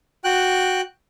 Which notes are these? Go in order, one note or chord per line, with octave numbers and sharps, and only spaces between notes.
F#4 G5 F#6